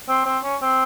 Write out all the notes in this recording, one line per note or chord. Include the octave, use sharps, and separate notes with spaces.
C4
C4
C#4
C4